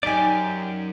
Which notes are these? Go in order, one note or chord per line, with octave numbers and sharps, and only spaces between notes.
F#2 D#4 G4 D5 G#5